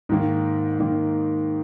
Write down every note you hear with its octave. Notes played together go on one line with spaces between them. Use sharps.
G#2 D#3 A#3
G#2 D#3 A#3